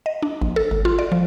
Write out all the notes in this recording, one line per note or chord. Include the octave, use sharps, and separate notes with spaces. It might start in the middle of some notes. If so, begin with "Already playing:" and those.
D#5
D4
A#1
A4
G#1
F4
D5
F3